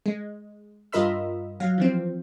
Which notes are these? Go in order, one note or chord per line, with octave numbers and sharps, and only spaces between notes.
G#3
G2 F4 A#4 D#5 B5 E6
F#3 F5
E3 F3 C4